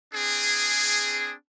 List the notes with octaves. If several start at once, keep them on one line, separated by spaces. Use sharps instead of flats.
C4 D4 G#4